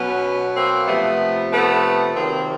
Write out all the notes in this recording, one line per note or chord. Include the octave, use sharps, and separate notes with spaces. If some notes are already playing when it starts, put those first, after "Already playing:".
Already playing: B2 F#3 B3 C#4
A#3 C4
C3 F3 A3 B3
A3 B3
C3 D#3 F#3 A#3 C4